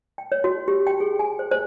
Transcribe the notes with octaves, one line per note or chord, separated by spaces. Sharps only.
G5
C#5
F#4
G4
G5
G#4
G#5
C5
C5